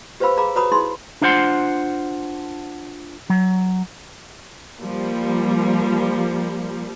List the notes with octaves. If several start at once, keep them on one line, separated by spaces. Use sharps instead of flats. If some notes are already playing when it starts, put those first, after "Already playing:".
G4 B4 C5 F5 B5 E6
G#4 F5 A#5 B5 D6
F#4 B4 C#5 A#5 B5 D#6
D#4 E4 G#4 B5 C6
D4 E4 F4 C5 F#5 C6
F#3
F3 G3 A#3